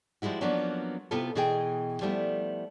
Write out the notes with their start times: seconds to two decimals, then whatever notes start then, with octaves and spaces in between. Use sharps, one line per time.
0.22 F3 G3 G#3 E4 F#4
0.41 F3 F#3 A#3 B3 C#4 D4
1.11 C3 B3 E4 F4 A4 A5
1.35 B2 E3 G#4 D#5 G5
2.01 F3 G3 A3 B3 E4